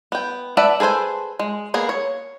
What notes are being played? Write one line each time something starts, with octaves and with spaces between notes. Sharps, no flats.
B3 G5
B4 D5 E5 F#5 A5
G#4 A4 B4 C5 G#5
G#3
A#3 B3 G#4
C#5